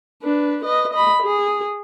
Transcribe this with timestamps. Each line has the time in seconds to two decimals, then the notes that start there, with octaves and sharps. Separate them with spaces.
0.22 D4 B4
0.64 B4 D#5
0.93 D#5 B5
1.22 G#4